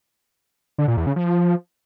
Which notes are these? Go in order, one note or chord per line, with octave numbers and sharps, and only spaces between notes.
D3
A#2
E2
C#3
F3